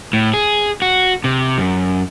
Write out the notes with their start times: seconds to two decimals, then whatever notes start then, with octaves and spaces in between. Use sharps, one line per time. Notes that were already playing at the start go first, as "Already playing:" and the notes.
0.13 A2
0.34 G#4
0.82 F#4
1.24 C3
1.58 F#2